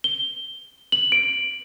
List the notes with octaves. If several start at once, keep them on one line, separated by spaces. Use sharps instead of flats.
G7
F#7
D7